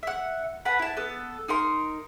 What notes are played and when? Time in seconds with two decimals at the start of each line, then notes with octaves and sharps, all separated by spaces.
0.03 E5 F#5
0.65 B4 F#5 A5 B5
0.79 E4 A5
0.97 B3 A4
1.48 D#4 A#4 C6